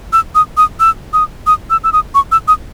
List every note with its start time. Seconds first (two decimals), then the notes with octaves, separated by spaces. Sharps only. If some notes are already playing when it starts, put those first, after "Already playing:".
0.13 E6
0.35 D#6
0.57 D#6
0.80 E6
1.13 D#6
1.47 D#6
1.70 E6
1.84 E6
1.93 D#6
2.15 C#6
2.32 E6
2.48 D#6